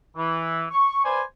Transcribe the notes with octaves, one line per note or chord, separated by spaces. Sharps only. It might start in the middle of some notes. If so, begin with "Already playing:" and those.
E3
C#6
B4 C5 D5 G#5